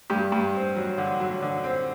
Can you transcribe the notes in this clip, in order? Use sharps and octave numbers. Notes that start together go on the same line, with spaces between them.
G2 G4
G2
C4
F#3
D3
F#3
D3
C4